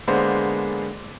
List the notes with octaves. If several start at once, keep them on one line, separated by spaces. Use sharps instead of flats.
D3 G#3 A#3 B3 D4 C5